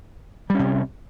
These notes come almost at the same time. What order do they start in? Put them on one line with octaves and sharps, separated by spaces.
G3 C#4 C3